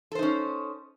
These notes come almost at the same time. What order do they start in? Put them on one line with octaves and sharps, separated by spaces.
A4 C5 D#4 C#4